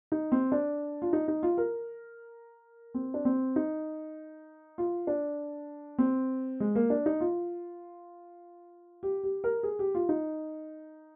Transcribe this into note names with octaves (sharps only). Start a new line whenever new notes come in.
D#4
C4
D4
F4
D#4
D#4
F4
A#4
C4
D4
C4
D#4
F4
D4
C4
G#3
A#3
D4
D#4
F4
G4
G4
A#4
G#4
G4
F4
D#4